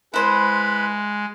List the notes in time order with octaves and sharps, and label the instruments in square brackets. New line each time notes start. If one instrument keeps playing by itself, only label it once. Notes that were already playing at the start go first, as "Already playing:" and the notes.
[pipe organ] G#3 [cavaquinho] E4 C5 [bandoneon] B4 B5